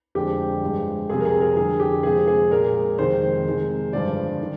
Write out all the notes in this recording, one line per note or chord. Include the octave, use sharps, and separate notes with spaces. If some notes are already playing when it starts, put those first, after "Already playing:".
F2 D3 F3 G#3 G4
G2 F3 G#3
F2 C3 G3 G#4
A#4
G#4
A#4
F2 D3 G3 G#4
G4
F2 C3 F3 G#3 G#4
G#4
A#2 G#3 A#4
F2 C3 D#3 G#3 C5
C3 D#3 G#3
G2 D3 F3 G#3 D5
D#3